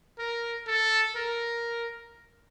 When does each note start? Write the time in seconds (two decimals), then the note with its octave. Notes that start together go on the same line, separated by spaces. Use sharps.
0.19 A#4
0.67 A4
1.16 A#4